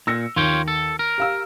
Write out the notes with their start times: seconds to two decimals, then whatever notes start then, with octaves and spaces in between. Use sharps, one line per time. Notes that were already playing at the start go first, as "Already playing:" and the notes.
0.07 A#2 E6 A#6 C#7
0.36 D#2 F4 C#5 G5
0.68 A4
0.99 A#4
1.18 G4 F5 E6